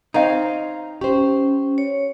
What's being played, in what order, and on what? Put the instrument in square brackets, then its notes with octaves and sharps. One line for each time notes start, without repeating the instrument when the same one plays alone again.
[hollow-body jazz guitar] C4 D#4 [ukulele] C#5 F5
[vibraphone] C#4 [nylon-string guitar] G4 C5
[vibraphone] C#5